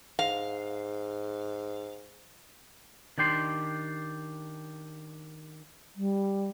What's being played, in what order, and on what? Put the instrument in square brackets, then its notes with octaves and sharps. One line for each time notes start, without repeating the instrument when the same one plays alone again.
[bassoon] G#2 [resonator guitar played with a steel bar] F5
[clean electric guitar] D#3 D4 G4 C6
[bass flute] G3